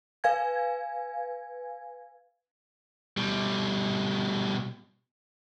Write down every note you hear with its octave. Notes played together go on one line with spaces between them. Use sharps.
B4 F5 G#5 G#6
B2 G3